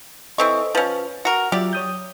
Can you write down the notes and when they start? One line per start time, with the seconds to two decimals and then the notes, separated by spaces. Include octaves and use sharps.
0.38 E3 C4 A4 C5 D#5 C#6
0.75 F3 C#4 B4
1.25 F#4 A#4
1.52 F#3 F4 G4 D5 E5
1.73 C#5 D#6 G6